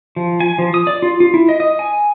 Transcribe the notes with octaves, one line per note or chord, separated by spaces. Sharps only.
F3
G#5
F3
D#6
D5
F4
F4
E4
D#5
D#5
G#5